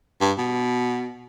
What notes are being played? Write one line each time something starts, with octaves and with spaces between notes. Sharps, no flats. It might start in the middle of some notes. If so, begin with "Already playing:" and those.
G2
B2